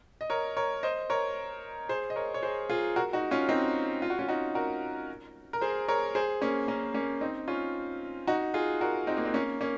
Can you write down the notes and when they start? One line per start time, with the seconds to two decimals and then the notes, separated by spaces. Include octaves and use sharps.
0.21 D#5
0.30 A#4 C#5
0.57 A#4 C#5
0.83 C5 D#5
1.10 A#4 C#5
1.89 G#4 C5
2.10 D#5
2.16 A#4 C#5
2.34 C#5
2.43 G#4 C5
2.70 F4 G#4
2.96 F#4 A#4
3.13 D#4 F#4
3.31 C#4 F4
3.49 C4 D#4
4.02 F4
4.10 F#4
4.19 C#4 F4
4.28 D#4 F#4
4.55 F#4 A#4
5.53 A#4
5.61 G#4 C5
5.88 A#4 C#5
6.15 G#4 C5
6.41 A#3 C#4
6.68 A#3 C#4
6.94 A#3 C#4
7.21 C4 D#4
7.48 C#4 F4
8.27 D#4 F#4
8.54 F4 G#4
8.81 F#4 A#4
9.07 C4 D#4
9.17 A#3
9.25 C4
9.34 A#3 C#4
9.61 A#3 C#4